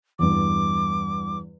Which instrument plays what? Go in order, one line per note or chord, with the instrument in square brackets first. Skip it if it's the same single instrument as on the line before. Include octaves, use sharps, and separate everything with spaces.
[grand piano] E2 G2 [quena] D6